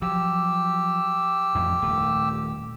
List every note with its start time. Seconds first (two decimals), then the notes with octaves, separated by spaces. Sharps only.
0.02 F3 F#3 G4 E6
1.55 A1 F2 F3
1.82 D#1 A3